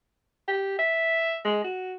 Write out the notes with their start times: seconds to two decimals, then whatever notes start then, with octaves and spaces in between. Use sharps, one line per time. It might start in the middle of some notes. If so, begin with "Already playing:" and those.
0.48 G4
0.79 E5
1.45 G#3
1.64 F#4